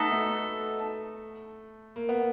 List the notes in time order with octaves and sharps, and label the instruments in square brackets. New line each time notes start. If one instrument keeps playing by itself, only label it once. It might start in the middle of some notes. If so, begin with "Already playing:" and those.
Already playing: [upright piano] A3 [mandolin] B3 D#4 F#4 A4
[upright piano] A3
A#3
B3